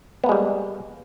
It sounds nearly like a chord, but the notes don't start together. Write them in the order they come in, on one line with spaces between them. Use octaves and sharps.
B3 A#3 G#3 G3